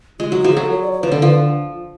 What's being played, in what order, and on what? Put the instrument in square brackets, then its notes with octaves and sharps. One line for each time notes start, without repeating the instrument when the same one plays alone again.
[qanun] G#3 [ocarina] F4
[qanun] F#3 [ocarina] F#4
[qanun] F3 [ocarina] F#4
[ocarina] G#4
[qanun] F#3 [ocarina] A4
[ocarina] C#5
D5
C#5
[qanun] F3 [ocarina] B4
[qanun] D3 [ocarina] A4
[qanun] F3 [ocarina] B4